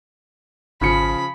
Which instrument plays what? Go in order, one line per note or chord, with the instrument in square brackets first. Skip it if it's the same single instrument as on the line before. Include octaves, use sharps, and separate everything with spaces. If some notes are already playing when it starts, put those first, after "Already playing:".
[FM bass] G#1 [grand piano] C#3 F3 C#7 [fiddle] B5